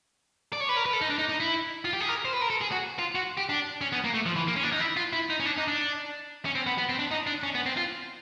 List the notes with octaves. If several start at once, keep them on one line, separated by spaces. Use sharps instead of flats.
D5
C#5
B4
A#4
B4
A4
D#4
D4
D#4
D#4
E4
F4
G4
G#4
A#4
C5
B4
A#4
A4
G#4
F#4
F4
F#4
G4
D4
C#4
B3
A#3
A3
F3
E3
A#3
C#4
D4
D#4
E4
F4
E4
D#4
C#4
D4
D#4
D4
C#4
C4
B3
B3
C4
D4
D#4
D4
C#4
B3
C4
F4